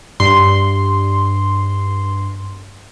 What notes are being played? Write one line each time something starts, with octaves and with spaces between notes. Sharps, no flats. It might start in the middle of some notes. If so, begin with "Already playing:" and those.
G2 C6